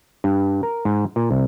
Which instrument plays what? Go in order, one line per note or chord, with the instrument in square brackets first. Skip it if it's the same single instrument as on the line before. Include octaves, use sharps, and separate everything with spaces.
[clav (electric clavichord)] G2
A#4
G#2
A#2
C2